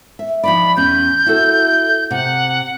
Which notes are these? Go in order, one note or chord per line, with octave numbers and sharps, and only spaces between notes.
E5
F3 D#4 D5 B5
E2 C#4 G6
E4 F#4 A4
C3 F#5